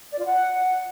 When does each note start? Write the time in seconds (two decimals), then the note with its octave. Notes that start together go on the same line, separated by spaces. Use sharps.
0.11 D5
0.18 F4
0.25 F#5